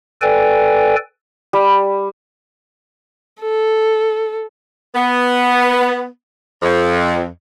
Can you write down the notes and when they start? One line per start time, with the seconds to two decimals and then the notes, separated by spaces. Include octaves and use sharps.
0.22 A4 B4 D5 G5 G#5
1.53 G3
3.41 A4
4.95 B3
6.63 F2